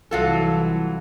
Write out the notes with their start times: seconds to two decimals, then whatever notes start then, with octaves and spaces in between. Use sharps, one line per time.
0.11 C2 E3 F#3 F4 A4